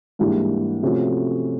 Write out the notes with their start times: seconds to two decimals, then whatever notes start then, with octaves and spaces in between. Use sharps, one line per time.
0.19 G#2 E3 G3 A#3 D4
0.83 C3 F3 A3 C#4 F#4